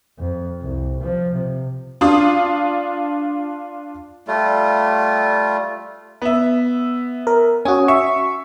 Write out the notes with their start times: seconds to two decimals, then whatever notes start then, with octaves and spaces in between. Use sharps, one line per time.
0.19 F2
0.61 C2
1.01 F3
1.33 C3
2.01 D4 F4 D#6
4.27 G3 A3 F4
6.22 B3 E5
7.27 A#4
7.65 C#4 F#4 G#5 D#6
7.88 E5 C#6